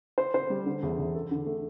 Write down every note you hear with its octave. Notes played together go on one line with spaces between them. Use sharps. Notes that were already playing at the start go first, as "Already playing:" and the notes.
C5
C5
G3
D3
E2
E2
A4
D3
A3